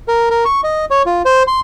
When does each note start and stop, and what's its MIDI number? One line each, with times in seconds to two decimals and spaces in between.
0.08 0.29 70
0.30 0.44 70
0.45 0.61 85
0.64 0.85 75
0.91 1.03 73
1.06 1.22 65
1.25 1.43 72
1.47 1.60 84